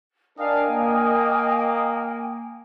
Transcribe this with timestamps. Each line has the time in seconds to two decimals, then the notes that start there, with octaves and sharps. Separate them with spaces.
0.39 D4 A#4 D#5 F5 G5 G#5
0.70 A#3